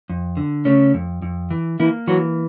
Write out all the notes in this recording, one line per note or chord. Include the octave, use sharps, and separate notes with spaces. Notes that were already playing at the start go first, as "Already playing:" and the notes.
F2
D3
C#3 A3 C#4
F2
F2
E3
E3 A#3 E4
E3 F#3 F#4